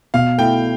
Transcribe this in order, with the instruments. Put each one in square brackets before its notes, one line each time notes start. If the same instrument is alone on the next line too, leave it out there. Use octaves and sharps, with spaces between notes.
[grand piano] B2 [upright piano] F5
[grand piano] A3 E4 [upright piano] G5